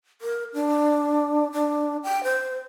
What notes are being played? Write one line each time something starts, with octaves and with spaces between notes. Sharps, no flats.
A#4
D4
D4
G5
C5